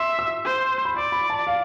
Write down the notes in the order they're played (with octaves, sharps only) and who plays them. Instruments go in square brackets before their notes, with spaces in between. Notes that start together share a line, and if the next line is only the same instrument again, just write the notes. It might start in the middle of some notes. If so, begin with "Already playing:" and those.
Already playing: [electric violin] E5 [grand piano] C6
[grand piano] E6
[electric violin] C5
[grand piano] B5
[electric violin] D5 [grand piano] C6
[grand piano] B5
A5
F5